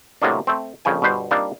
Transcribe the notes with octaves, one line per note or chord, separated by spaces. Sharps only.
A2 C3 F#3 G#3 A#3 D4
A3 C4
A#1 F2 C#3 G5 G#5
G1 B2 G3 B4 C5
G3 A#3 C4 D4 D#4 F4